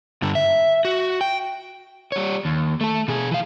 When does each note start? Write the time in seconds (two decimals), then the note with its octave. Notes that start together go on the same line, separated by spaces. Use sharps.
0.22 G2 D3
0.35 E5
0.85 F#4
1.21 G5
2.12 G3 C#5
2.45 D#2
2.81 A3 A4
3.08 B2 G#4
3.31 E3 F5